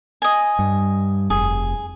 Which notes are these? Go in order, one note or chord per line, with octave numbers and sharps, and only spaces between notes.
D#5 G#5
G2
F1 G#4